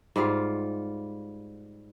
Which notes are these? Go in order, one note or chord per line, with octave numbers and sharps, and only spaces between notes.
G#2 G3 F4 F5